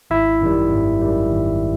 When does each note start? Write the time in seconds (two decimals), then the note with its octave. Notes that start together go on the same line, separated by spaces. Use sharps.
0.10 G#1 E4 E5
0.41 F#2 D#3 G3
0.71 G#1
1.01 F#2 D#3 G3
1.32 G#1